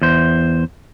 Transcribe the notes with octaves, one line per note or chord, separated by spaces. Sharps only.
E2 C5